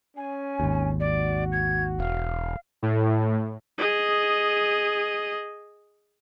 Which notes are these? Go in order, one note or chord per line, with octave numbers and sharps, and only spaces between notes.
C#4 G#5
G#1 D#2
F#4 D5
G#6
E1 F5
A2
G#4 D#5